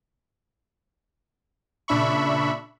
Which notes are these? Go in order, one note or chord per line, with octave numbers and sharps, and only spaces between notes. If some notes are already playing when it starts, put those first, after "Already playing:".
A#2 C#3 D4 E5 B5 C#6